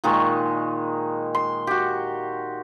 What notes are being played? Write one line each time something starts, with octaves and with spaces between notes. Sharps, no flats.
A#2 D#3 G#3 C#6
C6
F#4 G4